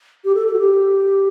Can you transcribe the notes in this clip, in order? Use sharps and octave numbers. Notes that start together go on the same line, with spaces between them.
G4
A4
A4
F#4
G4